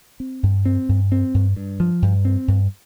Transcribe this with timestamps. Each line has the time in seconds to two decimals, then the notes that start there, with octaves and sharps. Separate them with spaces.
0.20 C4
0.43 G2
0.65 C4
0.89 G2
1.12 C4
1.34 G2
1.56 G2
1.80 F3
2.02 G2
2.25 C4
2.48 G2